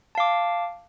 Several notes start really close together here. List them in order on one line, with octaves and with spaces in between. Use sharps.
A5 F5 D6